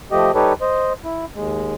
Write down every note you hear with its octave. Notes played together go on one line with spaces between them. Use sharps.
F3 A3 G4 D#5
G3 D#4 G4 A4 B4 C#5
C5 D#5
E4
D#2 G#3